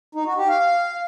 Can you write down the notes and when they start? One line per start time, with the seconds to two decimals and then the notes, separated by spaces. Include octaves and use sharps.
0.15 D#4
0.26 F#4
0.37 G4
0.49 F5